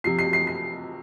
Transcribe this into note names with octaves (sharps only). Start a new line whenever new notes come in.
C3 F3 C7
C7
C7
C7